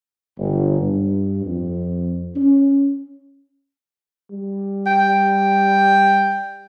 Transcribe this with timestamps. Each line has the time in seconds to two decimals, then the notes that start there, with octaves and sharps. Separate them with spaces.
0.39 G1
0.80 G2
1.45 F2
2.35 C#4
4.31 G3
4.87 G5